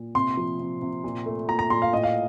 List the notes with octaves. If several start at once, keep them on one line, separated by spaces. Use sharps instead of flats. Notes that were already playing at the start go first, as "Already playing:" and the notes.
Already playing: A#2
C3 C6
F3
C3
C3
A#2
A3
A#2 A#5
A#5
A#2 C6
F5
A2 D#5
F5